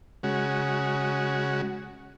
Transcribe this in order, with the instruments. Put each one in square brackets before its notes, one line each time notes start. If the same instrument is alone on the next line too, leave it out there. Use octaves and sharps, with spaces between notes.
[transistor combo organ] C#3 G#3 F#4